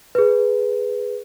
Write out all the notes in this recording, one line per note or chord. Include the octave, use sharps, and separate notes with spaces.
G#4 B4